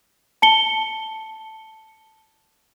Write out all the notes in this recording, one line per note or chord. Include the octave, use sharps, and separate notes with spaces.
A5 C#7 G7